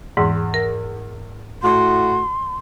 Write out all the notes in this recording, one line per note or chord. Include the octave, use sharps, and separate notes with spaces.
E2 G#2
A#4
A2 F#4 C6